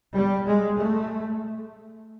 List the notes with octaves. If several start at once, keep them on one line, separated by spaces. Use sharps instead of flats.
G3
G#3
A3